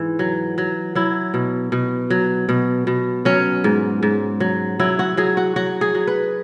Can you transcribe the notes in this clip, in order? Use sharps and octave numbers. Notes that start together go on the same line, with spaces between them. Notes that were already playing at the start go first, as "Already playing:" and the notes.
Already playing: G#2 E3
F#3
F#3
F#3 E4
B2
B2
F#3
B2
B2
F#3 C#4
G#2
G#2
F#3
F#3 E4
F#4
F#3 G#4
F#4
F#3 F#4
G#4
F#3
B4